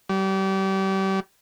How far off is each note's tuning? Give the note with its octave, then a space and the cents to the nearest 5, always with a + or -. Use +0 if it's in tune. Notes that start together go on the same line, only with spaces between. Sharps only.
G3 -30